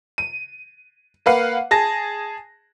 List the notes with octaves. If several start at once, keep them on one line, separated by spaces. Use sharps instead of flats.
D#7
A#3 B4 F5 F#5
G#4 A5 A#6